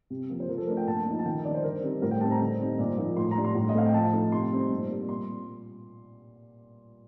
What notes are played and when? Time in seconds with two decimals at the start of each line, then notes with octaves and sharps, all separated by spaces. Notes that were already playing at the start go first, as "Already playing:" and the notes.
0.10 C3
0.29 F3 A#3
0.40 C5
0.49 F3 A#4
0.58 A4
0.68 A3 D4 A#4
0.77 G5
0.87 A#2 A5
1.06 F3 A#3 D#4
1.19 A5
1.25 D#3 G5
1.44 G3 D4 D5
1.54 C5
1.63 D3 A#4
1.83 G3 C4 D#4
2.02 A2 A#4
2.11 G5
2.21 G3 C4 D#4 A5
2.31 A#5
2.41 D3
2.59 G3 C4 D#4
2.79 A#2
2.98 F3 A#3 D#4
3.16 A2 C6
3.31 A#5
3.37 G3 D4
3.44 C6
3.55 A2
3.69 D#5
3.75 A3 C4 F5
3.86 G5
3.94 F3 A5
4.12 A3 D#4
4.32 C3 C6
4.52 G3 C4 D#4
4.71 A#2
4.90 G3 A#3
5.09 A#2 C6